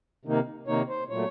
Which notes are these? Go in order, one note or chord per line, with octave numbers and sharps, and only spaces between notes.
C3 D#3 A#3 D#4
C3 D#3 A#3 D#4 C#5
C5
A#2 F#3 A3 C#5